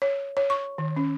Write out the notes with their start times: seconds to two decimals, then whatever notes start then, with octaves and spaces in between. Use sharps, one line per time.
0.02 C#5
0.37 C#5
0.50 C#6
0.78 D#3
0.96 C#4